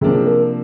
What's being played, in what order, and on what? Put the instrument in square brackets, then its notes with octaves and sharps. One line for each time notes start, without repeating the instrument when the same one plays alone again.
[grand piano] C3 F3 A#3 D4 [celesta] G#4
[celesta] A#4